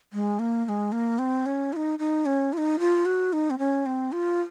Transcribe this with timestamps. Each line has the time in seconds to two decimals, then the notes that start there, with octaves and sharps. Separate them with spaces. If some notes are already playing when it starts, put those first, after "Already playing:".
0.13 G#3
0.39 A#3
0.65 A#3
0.69 G#3
0.92 A#3
1.19 C4
1.46 C#4
1.73 F4
1.76 D#4
1.99 D#4
2.26 C#4
2.53 F4
2.58 D#4
2.79 F4
3.05 F#4
3.33 D#4
3.50 C4
3.59 C#4
3.86 C4
4.12 F4